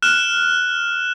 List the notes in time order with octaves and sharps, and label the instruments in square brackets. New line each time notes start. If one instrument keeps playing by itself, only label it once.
[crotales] F6 F#6 E7